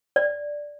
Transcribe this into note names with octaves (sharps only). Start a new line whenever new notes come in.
D5